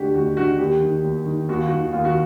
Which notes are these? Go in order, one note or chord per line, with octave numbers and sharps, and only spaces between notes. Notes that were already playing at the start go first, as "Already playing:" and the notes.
Already playing: D2 D3 F#4 G4
D2 F#4
D3 F#4
D#2 G4
D#3
D#2
D#3
D#2 F#4
F4
F#4
D#3
D#2 F4
F#4